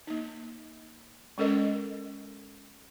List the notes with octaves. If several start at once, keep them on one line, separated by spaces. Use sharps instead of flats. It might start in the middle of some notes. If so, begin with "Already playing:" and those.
A#3 D#4
G#3 C#4 A4 A#4 D#5